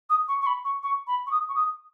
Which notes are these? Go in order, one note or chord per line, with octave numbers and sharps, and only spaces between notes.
D#6
C#6
C#6
B5
C#6
C#6
B5
C#6
D#6
C#6
D#6